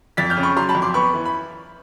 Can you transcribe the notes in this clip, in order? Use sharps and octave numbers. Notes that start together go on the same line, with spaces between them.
F2 A6 B6
F6 G6
C#3
B5 C#6
F#3 A#5 C6
A5 B5
F2
C6 D6
B3 B5 C#6
E3
B5